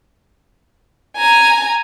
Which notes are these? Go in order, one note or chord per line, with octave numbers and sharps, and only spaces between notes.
G#5 A#5